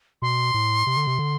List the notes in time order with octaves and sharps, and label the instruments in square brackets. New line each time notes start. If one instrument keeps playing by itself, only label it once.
[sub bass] B2 [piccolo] C6
[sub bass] A2
C3
D3
C3
D3